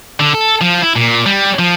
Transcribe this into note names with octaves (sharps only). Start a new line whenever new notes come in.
D3
A4
F3
E4
A#2
G3
F3